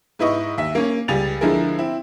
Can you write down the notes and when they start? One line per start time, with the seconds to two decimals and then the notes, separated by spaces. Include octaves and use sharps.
0.19 G#2 E4 B4 D#5 C#6
0.58 D#2 E5
0.75 A#3 C#4
1.08 C#2 G3 G#5 A6 F7
1.41 D3 F3 G#3 E4 G#4 A#4
1.79 C4 E4